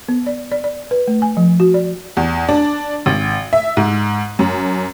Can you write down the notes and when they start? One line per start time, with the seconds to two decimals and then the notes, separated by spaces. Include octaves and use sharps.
0.08 B3
0.27 D5
0.52 D5
0.64 D5
0.91 B4
1.08 A3
1.22 G#5
1.37 F3
1.60 F#4
1.74 D5
2.17 E2
2.49 D4
3.06 G#1
3.53 E5
3.77 G#2
4.39 F#2